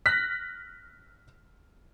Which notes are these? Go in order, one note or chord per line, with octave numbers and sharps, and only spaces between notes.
F6 F#6 A#6 B6